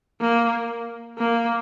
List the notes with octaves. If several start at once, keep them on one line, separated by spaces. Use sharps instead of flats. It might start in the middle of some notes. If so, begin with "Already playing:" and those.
A#3
A#3